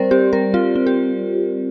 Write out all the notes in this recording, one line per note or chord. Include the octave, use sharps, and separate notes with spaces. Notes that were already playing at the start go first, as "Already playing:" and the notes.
Already playing: G3 C4 A#4 C5 D5
C4 G4
G3 A#4
C4 F4
C4
G4